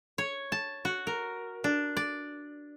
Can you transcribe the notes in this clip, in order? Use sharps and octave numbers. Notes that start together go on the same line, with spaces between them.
C#5
A5
F#4
A#4
D4
D5